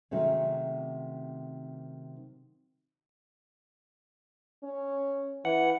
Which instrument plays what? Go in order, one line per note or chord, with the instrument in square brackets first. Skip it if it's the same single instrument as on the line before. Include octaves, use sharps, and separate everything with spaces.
[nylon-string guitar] C3 D#3 F#3 G#3 A3 C#4
[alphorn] C#4
[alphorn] E3 [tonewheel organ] F#5